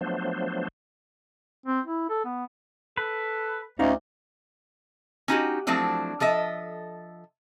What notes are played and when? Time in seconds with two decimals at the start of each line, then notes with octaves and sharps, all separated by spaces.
0.01 F3 F#3 A3 B3 D4 C5
1.66 C4
1.86 E4
2.09 A4
2.25 B3
2.97 A4 B4
3.79 D2 C#4 D#4 D5 F5
5.28 C#4 D#4 F#4 G4
5.67 F3 F#3 A3 C4 D4 E4
6.20 F3 A4 D#5 E5